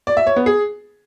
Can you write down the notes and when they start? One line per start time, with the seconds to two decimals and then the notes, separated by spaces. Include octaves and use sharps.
0.07 D5
0.17 E5
0.27 C#5
0.36 B3
0.46 G#4